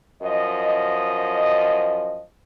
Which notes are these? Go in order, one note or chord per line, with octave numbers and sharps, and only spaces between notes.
F#2 F3 D#5